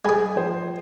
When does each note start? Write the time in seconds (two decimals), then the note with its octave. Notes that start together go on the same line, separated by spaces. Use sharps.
0.05 G#3 G#4 D#5 G#5 B5
0.36 F3 C5